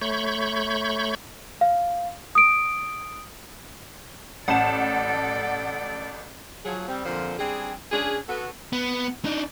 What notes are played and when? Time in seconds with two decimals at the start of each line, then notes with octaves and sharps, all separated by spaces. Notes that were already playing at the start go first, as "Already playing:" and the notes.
0.01 A3 C#5 B5 C#6 G6
1.61 F5
2.35 D#6 D7
4.48 A1 A4 D5 F#5 A5 E7
6.64 F3 F#3 G#4
6.88 G3 C4
7.05 F2 A#2 D3 F3 A4 C5
7.38 G3 C4 D4 G#4
7.91 D2 C#4 D4 G#4
8.28 B3 F#4 A4
8.73 B3
9.25 D4 D#4